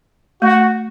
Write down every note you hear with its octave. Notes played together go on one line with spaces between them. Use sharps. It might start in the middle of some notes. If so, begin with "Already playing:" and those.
A3 F#4